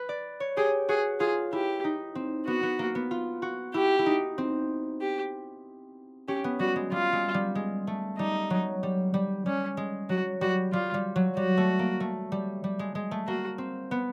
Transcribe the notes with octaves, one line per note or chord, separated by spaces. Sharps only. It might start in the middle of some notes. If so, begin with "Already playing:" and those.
Already playing: B4
D5
C#5
G4 G#4
F#4 G#4
F4 G#4
E4 G4
D#4
C4
B3 F#4
B3
A#3
B3
F4
F#4
E4 G4
E4
D#4
C4
G4
C#4 G4
B3
G3 F#4
G#3
G3 F4
G#3
G3
G#3
A3
G3 D#4
F#3
G3
G3
G3 C#4
G#3
F#3 F#4
G3 F#4
G3 F4
G3
F#3
G3 F#4
A3
A#3
A3
G3
G3
G#3
G#3
A3
A#3 F#4
C4
B3